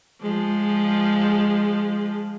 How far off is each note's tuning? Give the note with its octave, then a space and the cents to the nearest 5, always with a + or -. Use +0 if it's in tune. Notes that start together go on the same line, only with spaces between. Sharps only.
F3 +0 G#3 -10